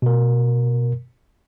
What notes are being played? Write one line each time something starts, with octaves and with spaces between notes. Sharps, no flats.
B2 A#4